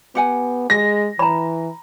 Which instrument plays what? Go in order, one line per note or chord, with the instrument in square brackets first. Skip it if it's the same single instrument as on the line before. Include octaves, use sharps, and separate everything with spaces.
[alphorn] B3 [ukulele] G4 F#5 G#5
[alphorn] G#3 [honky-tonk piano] A#6
[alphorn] E3 [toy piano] A#5 B5